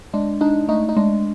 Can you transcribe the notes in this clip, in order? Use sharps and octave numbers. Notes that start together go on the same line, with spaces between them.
G#3 D4
D4 D#4
A3 D#4
D#4
G#3 D4